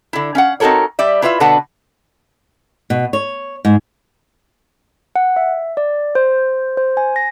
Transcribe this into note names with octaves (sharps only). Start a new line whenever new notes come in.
D3 E4
C#4 F5 F#5
C4 D#4 F#4 A4 A#4 C#5
G3 D5 E5
E4 F4 B4 D5 E5
B2 D3 D4 B4 F#5 A5
B2
C#5
G#2
F#5
E5
D5
C5
C5
G#5
A#6